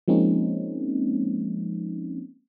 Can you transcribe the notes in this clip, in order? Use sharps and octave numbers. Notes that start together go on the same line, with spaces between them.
F3 G#3 A#3 C4 C#4 D#4